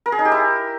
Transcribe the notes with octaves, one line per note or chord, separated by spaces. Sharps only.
A#4
G#4
D#4
G4
E4